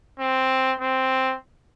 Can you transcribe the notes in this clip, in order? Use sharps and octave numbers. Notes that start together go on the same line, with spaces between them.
C4
C4